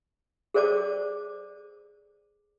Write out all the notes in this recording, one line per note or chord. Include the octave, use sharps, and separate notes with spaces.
G#4 A4 C5 D5 A5 D6